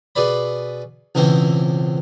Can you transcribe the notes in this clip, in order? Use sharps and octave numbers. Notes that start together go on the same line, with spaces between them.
B2 G#4 B4 D5 B5
C#2 B2 E3 G#3 C4